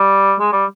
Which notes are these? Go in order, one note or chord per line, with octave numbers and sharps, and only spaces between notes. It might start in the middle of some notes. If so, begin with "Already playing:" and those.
Already playing: G3
G#3
G3